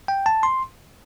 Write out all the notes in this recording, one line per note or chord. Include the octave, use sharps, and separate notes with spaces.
G5
A5
C6